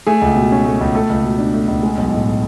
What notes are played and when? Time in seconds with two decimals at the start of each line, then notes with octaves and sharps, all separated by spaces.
0.07 A3 G#4
0.22 C#2
0.36 B2
0.52 C#4
0.65 A3
0.81 C#2
0.95 A3 A4
1.10 C#2
1.24 B2
1.38 D4
1.54 A3
1.68 C#2
1.83 G#3
1.98 B1
2.11 A2